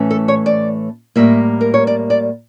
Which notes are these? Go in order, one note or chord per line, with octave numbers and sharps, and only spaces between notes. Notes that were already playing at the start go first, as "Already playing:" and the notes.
Already playing: A2 E3 A3 C#4
A4
C#5
D5
A2 G3 A#3 E5
A#4
C#5
D5
D5